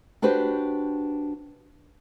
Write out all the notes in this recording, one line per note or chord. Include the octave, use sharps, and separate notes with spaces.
D4 F#4 G4 B4 C5